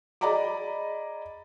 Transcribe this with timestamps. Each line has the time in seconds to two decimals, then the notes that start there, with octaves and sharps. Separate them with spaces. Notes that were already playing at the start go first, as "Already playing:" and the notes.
0.21 G#4 D5 D#5 A#5 B5 D6